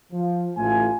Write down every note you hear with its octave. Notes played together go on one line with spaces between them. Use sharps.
F3
A1 A2 A3 F4 A4 G#5